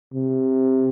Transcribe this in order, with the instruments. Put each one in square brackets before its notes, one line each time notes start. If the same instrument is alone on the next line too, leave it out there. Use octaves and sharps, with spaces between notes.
[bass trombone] C3